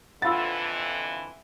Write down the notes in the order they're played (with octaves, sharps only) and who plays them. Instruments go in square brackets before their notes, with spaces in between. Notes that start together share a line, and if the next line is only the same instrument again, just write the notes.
[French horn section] F2 D3 E3 [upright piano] F4 A6 [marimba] F#5 B5 E6